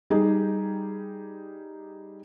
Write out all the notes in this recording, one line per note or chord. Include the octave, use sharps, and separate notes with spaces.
G3 D#4 G4 G#4